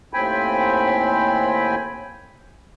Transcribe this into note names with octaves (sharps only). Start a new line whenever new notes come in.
D#2 A2 C4 G5 G#5 B5